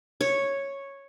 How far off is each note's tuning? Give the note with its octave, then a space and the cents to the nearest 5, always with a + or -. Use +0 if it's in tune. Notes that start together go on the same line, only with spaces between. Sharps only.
C#5 -5